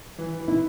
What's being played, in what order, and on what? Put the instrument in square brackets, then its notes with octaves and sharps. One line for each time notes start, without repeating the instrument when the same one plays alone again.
[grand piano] E3
E3
[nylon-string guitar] E4